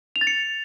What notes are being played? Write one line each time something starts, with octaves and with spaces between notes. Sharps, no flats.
F7
A6
C#7